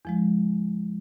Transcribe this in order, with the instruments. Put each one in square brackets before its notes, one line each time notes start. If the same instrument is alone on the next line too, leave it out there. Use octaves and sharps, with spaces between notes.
[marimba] E2 F3 G#3